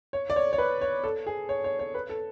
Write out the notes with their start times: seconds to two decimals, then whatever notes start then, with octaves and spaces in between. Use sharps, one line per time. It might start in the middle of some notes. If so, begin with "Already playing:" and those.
0.13 C#5
0.30 D5
0.36 C#5
0.53 C#5
0.58 B4
0.81 C#5
1.04 A4
1.26 G#4
1.49 C#5
1.64 C#5
1.79 C#5
1.94 B4
2.09 A4